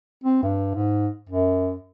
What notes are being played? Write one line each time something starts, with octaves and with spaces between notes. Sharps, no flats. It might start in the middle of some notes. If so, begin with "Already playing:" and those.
C4
G2
G#2
F#2